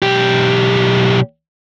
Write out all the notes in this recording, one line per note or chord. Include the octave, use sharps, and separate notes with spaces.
B1 G4